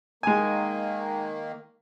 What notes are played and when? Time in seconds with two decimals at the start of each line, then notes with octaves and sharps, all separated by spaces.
0.23 D#3 G#3 A#3 G#5